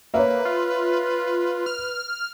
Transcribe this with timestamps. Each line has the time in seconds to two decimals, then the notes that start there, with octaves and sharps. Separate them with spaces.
0.14 A#3 B4 C#5 E5
0.45 F4
1.66 F6